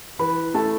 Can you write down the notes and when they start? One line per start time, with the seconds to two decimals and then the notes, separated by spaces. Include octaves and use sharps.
0.19 E3 B4 B5
0.54 A3 A4 A5